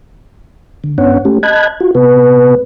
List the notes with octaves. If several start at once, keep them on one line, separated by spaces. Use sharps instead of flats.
D3
G2 B3 C#4 D4 C#5 F#5
A3 C#4 G4
D#5 A5 B5 F#6 G#6
F4 F#4
C3 B3 B4